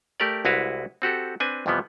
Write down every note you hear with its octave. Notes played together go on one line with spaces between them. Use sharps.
A3 G4 A#4 D5
C2 G#3 E4 F#4 B4 F5
C4 F#4 G4 A4
C4 D4 B4 G#5
F2 C3 E3 F3 G3 B3